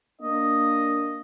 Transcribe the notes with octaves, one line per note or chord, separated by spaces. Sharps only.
A#3 D4 D#5